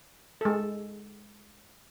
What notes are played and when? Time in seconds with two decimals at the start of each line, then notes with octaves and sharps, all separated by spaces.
0.41 G#3 A4